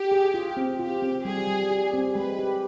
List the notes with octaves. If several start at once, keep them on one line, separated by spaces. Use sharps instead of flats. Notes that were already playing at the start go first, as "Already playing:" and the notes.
Already playing: G4
G#4
F4
C4
F4 G4
C4
G3 G#4
G3
G4
C4
G#3 B4
G4